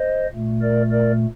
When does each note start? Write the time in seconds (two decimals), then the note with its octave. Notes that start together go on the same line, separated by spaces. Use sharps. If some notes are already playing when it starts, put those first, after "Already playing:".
Already playing: C5 D#5
0.33 A#2 A3
0.62 A#4 D5
0.91 A#4 D5